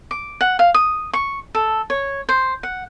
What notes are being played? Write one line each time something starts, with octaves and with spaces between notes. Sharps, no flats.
D6
F#5
F5
D#6
C#6
A4
C#5
C5
F#5